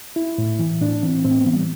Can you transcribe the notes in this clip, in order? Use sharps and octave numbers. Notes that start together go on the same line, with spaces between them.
E4
A2
E3
A2 D4
E3 C4
A2 C4
B3
E3
G3